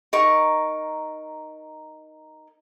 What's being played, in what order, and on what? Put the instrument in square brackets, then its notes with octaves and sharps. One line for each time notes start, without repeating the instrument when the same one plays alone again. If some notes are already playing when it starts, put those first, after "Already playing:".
[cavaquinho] D#4 A#4 C#6